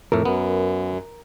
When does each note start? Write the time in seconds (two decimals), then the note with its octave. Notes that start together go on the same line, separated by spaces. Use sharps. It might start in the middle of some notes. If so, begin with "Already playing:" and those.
0.12 F2 A2 A3 A#4
0.25 F#2 B3